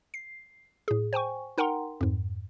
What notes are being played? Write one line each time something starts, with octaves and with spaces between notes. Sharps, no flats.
C7
A2 G#4
C5 G5 G#5 C#6
D#4 A#4 F#5 G5 A#5 C6
F2 G#2